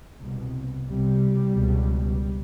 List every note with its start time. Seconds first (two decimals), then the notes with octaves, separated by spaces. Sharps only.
0.21 C2 B2
0.87 C2 C3 G3
1.53 C#2 B2